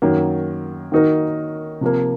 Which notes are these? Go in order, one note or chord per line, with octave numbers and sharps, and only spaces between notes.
F#2 D#3 F#3 A#3
D#3 A#3 D#4 F#4 A#4
C3 F3 A#3